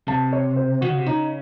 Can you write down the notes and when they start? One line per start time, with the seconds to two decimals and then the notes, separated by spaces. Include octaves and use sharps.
0.08 C3 A5
0.33 C#5
0.56 C5
0.81 D#3 F#4
0.89 C#3
0.98 C3
1.06 C#3 D#4